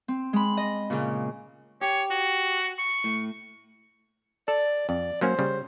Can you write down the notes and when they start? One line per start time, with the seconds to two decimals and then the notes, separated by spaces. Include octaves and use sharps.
0.08 C4
0.33 G#3 B5
0.57 D#5
0.90 A#2 C#3
1.81 G4 C#5
2.10 F#4
2.79 C#6
3.04 A2
4.48 A4 D5
4.89 F2 D5
5.21 F#3 A#3 C#4 C5
5.39 C#3 G3